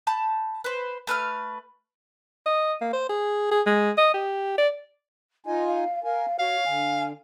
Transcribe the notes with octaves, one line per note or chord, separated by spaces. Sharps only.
A5 B5 G6
B4 C5
A3 B4 G#5 F6
D#5
A#3
C5
G#4
G#4
G#3
D#5
G4
D5
D#4 F4 D#5 G#5
F5
A#4 F5 G#5
F#4 C#5 F5
D3 G#5